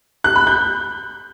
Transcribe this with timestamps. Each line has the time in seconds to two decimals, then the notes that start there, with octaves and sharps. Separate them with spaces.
0.24 F#6
0.36 B5
0.47 G6